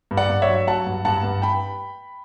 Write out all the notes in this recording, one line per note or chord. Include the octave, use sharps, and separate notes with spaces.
G2
D5 F#5
G2
C#5 E5
F#3
F#3 F#5 A5
G2
G2 F#5 A5
G2
G2 G5 B5